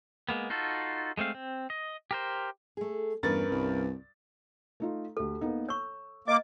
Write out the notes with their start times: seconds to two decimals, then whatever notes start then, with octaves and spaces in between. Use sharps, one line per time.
0.29 G#3 A#3 B3
0.50 D#4 F4 F#4 A4
1.17 G#3 A3 C4 F5
1.34 C4
1.70 D#5
2.11 G4 A#4 C5
2.77 A3 G#4
3.23 E2 G2 C#4 A#4 B4 A6
3.51 C2
4.80 A3 D#4 F4
5.17 D2 G4 A4
5.41 A#3 B3 D#4
5.69 C#5 C#6 E6
6.28 A#3 D#5 D6